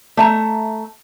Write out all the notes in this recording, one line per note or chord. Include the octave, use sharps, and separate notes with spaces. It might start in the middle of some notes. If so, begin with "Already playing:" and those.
A3 E5 A#5